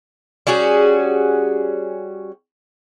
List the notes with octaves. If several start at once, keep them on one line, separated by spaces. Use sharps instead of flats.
G3 C#4 F#4 G#4